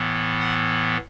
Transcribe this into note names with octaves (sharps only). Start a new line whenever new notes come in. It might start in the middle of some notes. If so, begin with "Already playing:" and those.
Already playing: A2 E3 B3
F#5